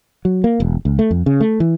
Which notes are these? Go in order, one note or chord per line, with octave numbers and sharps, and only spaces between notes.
F#3
A#3
E1
C#2
A3
F2
C#3
A3
E3